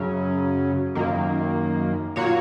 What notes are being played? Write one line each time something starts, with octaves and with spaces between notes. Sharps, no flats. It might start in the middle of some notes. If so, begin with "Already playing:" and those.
Already playing: F#2 C#3 F#3 C#4
F#2 D#3 A#3
A#2 A#3 F#4 C#5